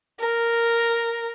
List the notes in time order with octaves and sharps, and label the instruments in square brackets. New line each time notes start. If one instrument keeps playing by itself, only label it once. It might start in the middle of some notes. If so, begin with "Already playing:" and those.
[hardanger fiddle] A#4